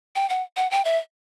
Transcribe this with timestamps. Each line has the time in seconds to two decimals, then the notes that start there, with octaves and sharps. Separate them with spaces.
0.16 G5
0.29 F#5
0.57 F#5
0.71 G5
0.85 E5